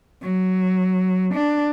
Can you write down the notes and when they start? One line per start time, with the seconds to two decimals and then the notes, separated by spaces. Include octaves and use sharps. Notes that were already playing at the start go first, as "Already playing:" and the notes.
0.22 F#3
1.34 D4